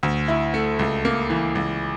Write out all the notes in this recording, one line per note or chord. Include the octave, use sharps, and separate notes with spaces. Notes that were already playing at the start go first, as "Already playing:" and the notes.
D2
E4
A3
C#2
A#3
E3
C#2